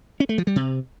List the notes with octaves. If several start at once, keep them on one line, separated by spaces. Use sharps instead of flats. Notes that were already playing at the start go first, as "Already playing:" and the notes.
C#4
A3
F3
G3
C3